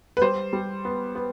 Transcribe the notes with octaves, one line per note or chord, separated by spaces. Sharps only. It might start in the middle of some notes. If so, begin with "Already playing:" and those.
B4
G3 C5
G3
B3
B3